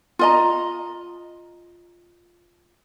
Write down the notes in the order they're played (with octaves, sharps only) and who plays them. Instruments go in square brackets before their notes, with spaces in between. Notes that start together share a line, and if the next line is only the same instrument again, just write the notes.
[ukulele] F4 D#5 A#5